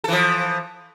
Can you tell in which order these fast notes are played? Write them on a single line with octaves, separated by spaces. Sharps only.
A4 E3 F3